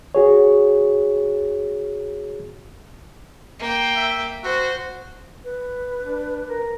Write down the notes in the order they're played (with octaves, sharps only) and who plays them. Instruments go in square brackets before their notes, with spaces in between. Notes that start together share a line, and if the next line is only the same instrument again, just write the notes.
[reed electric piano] F#4 G#4 C#5
[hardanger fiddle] A#3 G5
[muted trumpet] E5
[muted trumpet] F#4 [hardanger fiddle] C5
[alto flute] B4
[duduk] D4
A#4